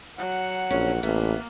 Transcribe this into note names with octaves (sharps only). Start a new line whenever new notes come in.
F#3 F#5
A#1 C#4
A1 A#3 B3 E5